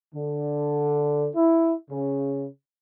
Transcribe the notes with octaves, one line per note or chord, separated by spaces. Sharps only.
D3
E4
C#3